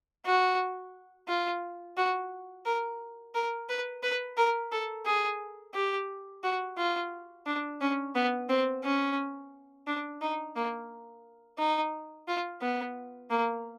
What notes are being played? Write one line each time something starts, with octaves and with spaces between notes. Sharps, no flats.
F#4
F4
F#4
A#4
A#4
B4
B4
A#4
A4
G#4
G4
F#4
F4
D4
C#4
B3
C4
C#4
D4
D#4
A#3
D#4
F4
B3
A#3